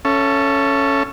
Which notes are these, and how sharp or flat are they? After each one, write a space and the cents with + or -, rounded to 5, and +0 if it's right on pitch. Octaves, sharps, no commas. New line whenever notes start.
C#4 +0 A4 +0 E5 +30